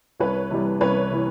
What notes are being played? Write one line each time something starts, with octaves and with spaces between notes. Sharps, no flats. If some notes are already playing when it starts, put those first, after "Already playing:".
C2 B4 C#5
C3 E3 G3
C2 B4 C#5
C3 E3